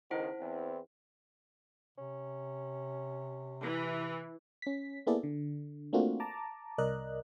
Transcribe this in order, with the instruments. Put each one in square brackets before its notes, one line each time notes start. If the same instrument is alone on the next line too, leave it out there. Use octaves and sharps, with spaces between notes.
[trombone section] C#2 D#3 [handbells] E4 C5 F#5
[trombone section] E2 C4
[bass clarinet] C3 [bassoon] C#4
[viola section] E3
[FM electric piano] C#4 B6
A#3 B3 E4 G#4 A4 D5
D3
A3 A#3 C4 D4 F4 F#4
A5 A#5 D6
C2 A#4 D5 D#5 F#6